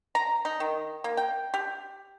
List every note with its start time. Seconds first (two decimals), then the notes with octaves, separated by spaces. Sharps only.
0.15 A#5
0.45 D#4
0.60 D#3
1.04 A#3
1.17 G5
1.54 G4